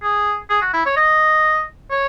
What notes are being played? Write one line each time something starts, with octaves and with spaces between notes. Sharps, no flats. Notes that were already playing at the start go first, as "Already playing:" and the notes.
G#4
G#4
F#4
E4
C#5
D#5
C#5